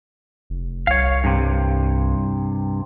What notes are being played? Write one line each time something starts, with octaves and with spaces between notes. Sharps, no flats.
F1
C2 C#5 F5
G2 C3